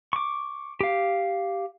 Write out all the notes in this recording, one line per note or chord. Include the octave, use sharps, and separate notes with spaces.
C#6 D6
G4 F5